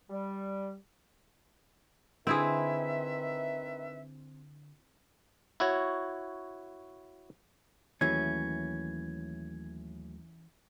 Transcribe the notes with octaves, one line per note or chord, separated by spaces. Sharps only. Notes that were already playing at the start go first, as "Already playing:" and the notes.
G3
D3 D#3 C4 E4 G#4 B4 E5
E4 F#4 C#5
D#2 E3 F#3 A3 C#4 G#6